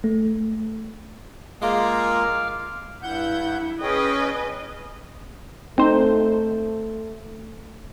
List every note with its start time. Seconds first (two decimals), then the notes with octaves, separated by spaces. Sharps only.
0.04 A3
1.62 G#3 A#3 F4 F5 D6 F6
3.03 G2 E4 F#5 G6
3.82 C#4 G#4 B4 D#5 G5
5.78 A3 C4 D#4 C5